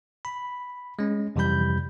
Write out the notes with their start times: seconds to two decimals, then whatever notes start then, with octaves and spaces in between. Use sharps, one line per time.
0.25 B5
0.99 G#3 C#4
1.36 F2 C3 E3 G3 B5 G6